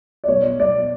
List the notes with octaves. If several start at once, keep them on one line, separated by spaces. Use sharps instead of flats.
D5
B1 C#5
B1 D5